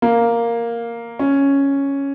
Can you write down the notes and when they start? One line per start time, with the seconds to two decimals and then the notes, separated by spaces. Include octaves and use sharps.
0.02 A#3
1.19 C#4